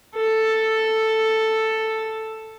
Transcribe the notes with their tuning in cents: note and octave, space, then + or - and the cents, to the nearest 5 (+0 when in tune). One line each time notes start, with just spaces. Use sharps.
A4 +5